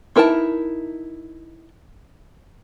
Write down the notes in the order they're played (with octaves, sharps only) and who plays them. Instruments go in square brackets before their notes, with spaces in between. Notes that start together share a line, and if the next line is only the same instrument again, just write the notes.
[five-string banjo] D#4 E4 A#4 D5 A5